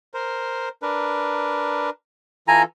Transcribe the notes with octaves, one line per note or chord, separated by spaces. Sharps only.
A#4 C5
D4 A#4 B4
E3 F4 A4 G#5 A#5